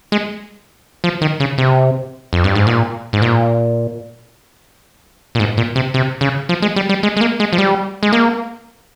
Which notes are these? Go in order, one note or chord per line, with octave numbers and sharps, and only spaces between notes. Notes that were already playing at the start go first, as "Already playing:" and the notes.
G#3
F3
D#3
C#3
C3
F2
G2
G#2
A#2
G#2
A#2
A#2
G#2
A#2
C3
C3
C#3
F3
G#3
G3
G3
G#3
G#3
A#3
G#3
F3
G3
G#3
A#3